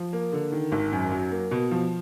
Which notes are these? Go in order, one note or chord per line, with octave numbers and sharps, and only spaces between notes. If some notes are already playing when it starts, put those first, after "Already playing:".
Already playing: F3
A#3
D3
D#3
G#1
F#2
F#3
A#3
B2
F3